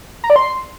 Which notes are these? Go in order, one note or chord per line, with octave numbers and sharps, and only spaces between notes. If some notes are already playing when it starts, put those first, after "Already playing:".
A#5
D5
C6